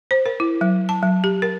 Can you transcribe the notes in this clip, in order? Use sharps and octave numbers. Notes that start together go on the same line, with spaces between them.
C5
A#4
E4
F#3
A5
F#3
G4
A#4